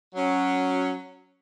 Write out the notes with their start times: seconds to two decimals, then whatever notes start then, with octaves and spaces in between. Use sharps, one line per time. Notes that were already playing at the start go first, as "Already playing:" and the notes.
0.15 F#3 C#4